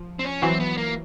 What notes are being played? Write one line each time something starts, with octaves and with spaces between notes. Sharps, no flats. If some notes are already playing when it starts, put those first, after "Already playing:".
Already playing: F3
C4
C#4
E3 F#3 C4
B3
A#3